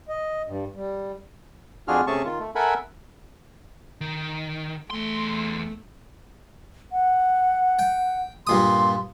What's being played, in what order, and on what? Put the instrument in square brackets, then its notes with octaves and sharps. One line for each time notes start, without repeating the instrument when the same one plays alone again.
[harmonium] D#5
G2
G3
[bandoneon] F2 D4 F4 F#4 G#4 F6
C3 A3 C#4 G#4 A5 C#6
D#3 F4
A3
A4 A#4 E5 F#5 G#5 B5
[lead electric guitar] D#3
[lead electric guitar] E2 C6 [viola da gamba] A3
[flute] F#5
[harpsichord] G5
[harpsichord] G2 A#2 D#6 [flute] C6